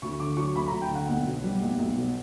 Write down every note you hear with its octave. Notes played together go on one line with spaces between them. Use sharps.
D2 C#6
D3 D6
F#3 C#6
D2 B5
D2 A#5
G5
D3
F#5
B1
B2
G3
B1
B1
B2